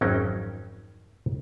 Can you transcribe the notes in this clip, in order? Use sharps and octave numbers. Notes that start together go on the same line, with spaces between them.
G#1 F2 F#3 C#4 D#4 G5